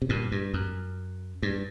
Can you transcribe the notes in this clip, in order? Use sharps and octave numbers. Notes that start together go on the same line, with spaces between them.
C3
G2 A#2
G2
F#2
G2